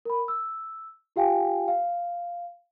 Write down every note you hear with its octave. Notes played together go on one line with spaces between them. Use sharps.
A#4 B5
E6
F4 G4 F5 G5 G#5
F5